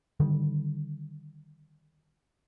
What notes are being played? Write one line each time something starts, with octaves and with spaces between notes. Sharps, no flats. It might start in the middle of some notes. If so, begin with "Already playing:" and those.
D3 D#3 G3